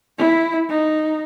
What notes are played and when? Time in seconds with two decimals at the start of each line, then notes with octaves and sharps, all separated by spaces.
0.17 E4
0.69 D#4